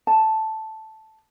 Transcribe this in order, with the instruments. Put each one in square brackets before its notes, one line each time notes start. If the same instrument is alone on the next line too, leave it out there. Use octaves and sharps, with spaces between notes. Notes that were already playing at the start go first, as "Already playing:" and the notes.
[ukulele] A5